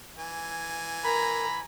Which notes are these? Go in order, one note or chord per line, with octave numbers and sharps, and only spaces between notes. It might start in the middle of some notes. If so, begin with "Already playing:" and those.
E3 G#5
A#4 A#5 B5